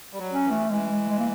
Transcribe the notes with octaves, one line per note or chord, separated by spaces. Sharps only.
G3
F#3
C#4
E3
A3
E3 G#3
G#3
G#3
A#3